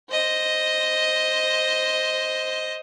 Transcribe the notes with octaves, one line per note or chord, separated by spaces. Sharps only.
C5 D#5